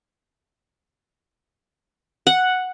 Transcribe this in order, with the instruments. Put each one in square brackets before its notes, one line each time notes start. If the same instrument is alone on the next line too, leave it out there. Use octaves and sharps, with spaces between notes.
[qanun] F#5